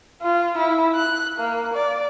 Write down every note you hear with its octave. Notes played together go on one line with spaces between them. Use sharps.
F4
E4
F#6
A#3
D5